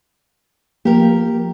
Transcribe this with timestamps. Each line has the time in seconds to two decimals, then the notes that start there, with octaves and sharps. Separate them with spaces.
0.85 F3 A#3 G4 A#4